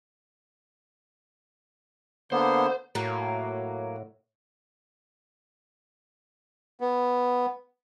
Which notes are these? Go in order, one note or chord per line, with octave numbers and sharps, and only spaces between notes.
D3 A#3 B3 C5
A2 F#3 A#3
B3